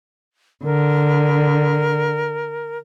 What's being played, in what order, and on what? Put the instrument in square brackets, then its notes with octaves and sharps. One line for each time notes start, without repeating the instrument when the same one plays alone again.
[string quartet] D3 [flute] A#4